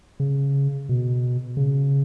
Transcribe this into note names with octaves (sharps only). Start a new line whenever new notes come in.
C#3
B2
C#3